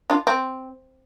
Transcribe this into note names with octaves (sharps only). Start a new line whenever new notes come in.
D4 F4
C4